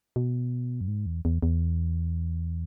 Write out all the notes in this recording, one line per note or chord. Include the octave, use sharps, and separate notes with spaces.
B2
F#2
G#2
E2
E2
E2